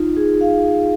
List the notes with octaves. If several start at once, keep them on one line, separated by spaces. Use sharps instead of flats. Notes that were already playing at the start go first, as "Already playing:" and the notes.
Already playing: D#4 F4
G#4
F5